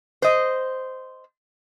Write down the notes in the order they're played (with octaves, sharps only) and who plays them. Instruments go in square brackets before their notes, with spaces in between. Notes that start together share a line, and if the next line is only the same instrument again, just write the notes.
[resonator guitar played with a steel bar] C5 D#5